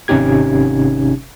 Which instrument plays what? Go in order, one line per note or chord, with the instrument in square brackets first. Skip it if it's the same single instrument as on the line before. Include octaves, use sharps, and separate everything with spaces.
[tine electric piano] G#1 C3 C#4 D#4 G4 G#6